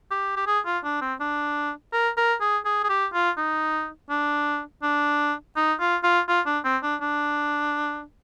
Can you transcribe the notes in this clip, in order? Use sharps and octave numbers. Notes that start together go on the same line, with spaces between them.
G4
G4
G#4
F4
D4
C4
D4
A#4
A#4
G#4
G#4
G#4
G4
F4
D#4
D4
D4
D#4
F4
F4
F4
D4
C4
D4
D4